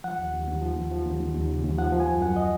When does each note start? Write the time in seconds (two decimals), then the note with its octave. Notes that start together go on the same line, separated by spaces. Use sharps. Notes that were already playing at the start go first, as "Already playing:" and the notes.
0.04 F3 F#5
0.18 D#2
0.33 D#2
0.48 D#2
0.62 F3
0.77 D#2
0.91 F3
1.06 D#2
1.20 D#2
1.35 D#2
1.49 C#3
1.63 D#2
1.78 F3 F#5
1.92 F3
2.00 G#5
2.07 F#2
2.21 F#2 F#5
2.36 D#5